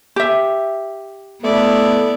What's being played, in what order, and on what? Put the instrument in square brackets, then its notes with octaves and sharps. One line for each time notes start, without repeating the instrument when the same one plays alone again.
[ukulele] G4 E5
[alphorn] A3 [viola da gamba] B3 [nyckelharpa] E4 D5